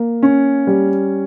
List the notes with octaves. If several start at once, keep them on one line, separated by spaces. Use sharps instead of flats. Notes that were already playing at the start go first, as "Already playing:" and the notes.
Already playing: A#3
C#4
G3